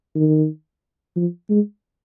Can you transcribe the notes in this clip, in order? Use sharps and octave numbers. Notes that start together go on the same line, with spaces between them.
D#3
F3
G#3